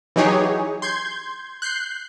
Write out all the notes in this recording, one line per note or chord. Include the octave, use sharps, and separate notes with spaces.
E3 F#3 D#4 G4 G#4 C#5
C6 G6 G#6
F#6 G6 C7